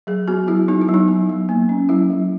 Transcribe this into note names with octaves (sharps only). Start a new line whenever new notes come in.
F#3 G#4
B3 F#4
F#3 E4
B3 D#4
E4
F#3
D#4
B3
F#3
A#3
C#4
F#3 E4
F#3